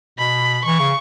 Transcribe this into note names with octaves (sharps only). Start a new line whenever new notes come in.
B2 B5
E3 C#6
C#3